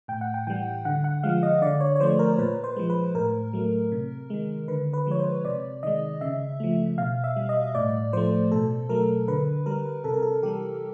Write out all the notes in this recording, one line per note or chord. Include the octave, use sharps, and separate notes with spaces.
A2 G5
F#5
G5
E3 G3 G5
D3 F#5
F#5
F3 G#3 F5
D#5
D3 D5
C#5
C#5
F3 A3 C5
A#4
A#2 B4
C5
F3 G#3
B4
A2 A#4
F#3 A3
C3
D#3 G#3
D3 B4
B4
F3 G#3 C#5
C5
C3 D5
D#3 G#3 D#5
C#3 E5
F3 A3
B2 F5
E5
G3
D#5
A2 D5
F3 A3 C5
B2 A4
F#3 A3 A#4
D3 B4
G3 A#4
C3 A4
A#4
A4
E3 G3 G4